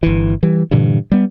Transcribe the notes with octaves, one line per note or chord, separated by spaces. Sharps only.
G1 E3
E3 G3
G2 A#2 D3 E3
G3 B3